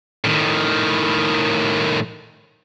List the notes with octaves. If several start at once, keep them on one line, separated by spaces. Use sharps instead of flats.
A2 D#3